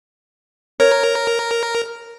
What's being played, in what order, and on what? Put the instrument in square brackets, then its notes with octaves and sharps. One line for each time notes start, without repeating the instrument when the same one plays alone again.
[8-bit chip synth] A#4 [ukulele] C#5